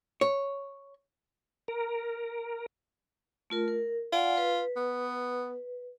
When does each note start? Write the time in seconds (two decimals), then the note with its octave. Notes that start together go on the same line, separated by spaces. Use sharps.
0.21 C#5
1.68 A#4
3.50 A3 F4 A#4
3.68 A#4
4.13 F4 D5 F#5 G#5
4.37 B4
4.76 B3